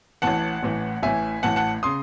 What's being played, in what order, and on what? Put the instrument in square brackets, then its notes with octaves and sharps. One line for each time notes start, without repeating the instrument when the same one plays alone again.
[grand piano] A1 A2 E3 F#5 A5
A1 A2 E3
A1 A2 E3 E5 G#5
A1 A2 E3 F#5 A5
F#5 A5
C#3 C6 D#6